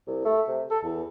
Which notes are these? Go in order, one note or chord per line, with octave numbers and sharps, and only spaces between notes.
C2
A3
C3
A4
E2